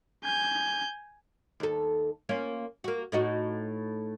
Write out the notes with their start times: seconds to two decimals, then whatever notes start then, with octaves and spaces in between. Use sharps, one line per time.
0.24 G#5 G6
1.60 D#2 A4
2.29 A#3 C#4 F4
2.84 A#3 F#4
3.12 A2 D#4 F#4